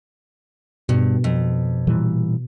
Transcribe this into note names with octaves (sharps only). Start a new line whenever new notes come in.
G2 B2
F2
A#2 E3 G3